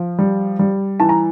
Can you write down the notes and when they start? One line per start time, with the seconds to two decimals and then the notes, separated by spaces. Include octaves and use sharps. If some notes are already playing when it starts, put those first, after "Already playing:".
Already playing: F3
0.18 G3
0.59 G3
1.00 E3 A5
1.09 A#5